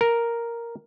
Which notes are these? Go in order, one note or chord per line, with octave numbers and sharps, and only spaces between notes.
A#4